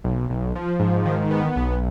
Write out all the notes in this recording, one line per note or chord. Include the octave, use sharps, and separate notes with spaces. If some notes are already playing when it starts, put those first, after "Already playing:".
B1
B1
F3
G#2
D#3
B3
B1